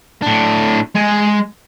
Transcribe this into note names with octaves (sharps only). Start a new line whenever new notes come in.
A2 D4
G#3 G#5